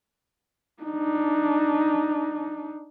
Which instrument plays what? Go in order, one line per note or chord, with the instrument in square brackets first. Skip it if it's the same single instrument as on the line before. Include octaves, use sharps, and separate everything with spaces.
[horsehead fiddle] D4 D#4